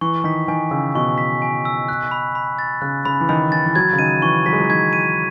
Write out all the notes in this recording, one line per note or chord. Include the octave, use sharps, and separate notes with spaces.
E3 C#6
D#3 B6
D#3 G#5
C#3 E6
B2 C#6
B6
G#5
E6
F#6
B5
B5
A6
C#3 F#6
C#3 B5
E3
D#3 B5
E3 A6
E3
F#3 G#6
C#3
D#3 D#7
E3 C#6
F#3 B6
G#3
F#3
D#3 G#6
D#7